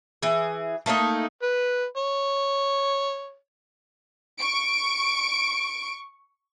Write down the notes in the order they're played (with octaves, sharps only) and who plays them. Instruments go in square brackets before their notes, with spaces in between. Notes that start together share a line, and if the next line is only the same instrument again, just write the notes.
[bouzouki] E3 G#4
A3 A#3 C#4 D#4
[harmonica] B4
C#5
[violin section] C#6 D7